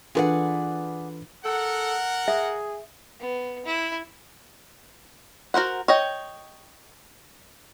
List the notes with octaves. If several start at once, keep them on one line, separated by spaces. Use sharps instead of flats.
E3 D4 F4 G#4 A4 B4 D5 F#5
A4 A#4 F#5
G#4 E5
B3
E4
F#4 A#4 C5 F#5
C#5 D#5 G5